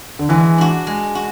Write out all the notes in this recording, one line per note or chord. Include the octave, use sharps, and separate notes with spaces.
D3
E3 G#3
D4 F#4
G#3
F#4